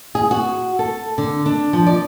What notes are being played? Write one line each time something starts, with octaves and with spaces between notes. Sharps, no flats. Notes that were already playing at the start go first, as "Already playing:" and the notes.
G#4
F#4
A4
D3
D4
F3
D5